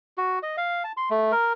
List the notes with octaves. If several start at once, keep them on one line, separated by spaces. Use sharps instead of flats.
F#4
D#5
F5
A5
C6
A3
A#4